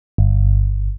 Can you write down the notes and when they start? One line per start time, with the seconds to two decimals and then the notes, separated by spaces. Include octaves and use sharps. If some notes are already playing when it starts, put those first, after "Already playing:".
0.18 G1